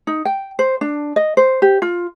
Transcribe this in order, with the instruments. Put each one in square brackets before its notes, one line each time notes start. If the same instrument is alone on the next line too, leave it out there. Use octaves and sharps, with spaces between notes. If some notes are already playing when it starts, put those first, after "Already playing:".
[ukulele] D#4
G5
C5
D4
D#5
C5
G4
F4